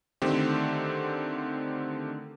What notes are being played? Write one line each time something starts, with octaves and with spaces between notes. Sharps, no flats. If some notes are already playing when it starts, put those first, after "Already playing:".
D3 D#3 A3 C4 G4